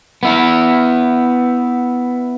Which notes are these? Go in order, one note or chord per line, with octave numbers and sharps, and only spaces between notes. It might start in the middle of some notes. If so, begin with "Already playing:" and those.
B3 E4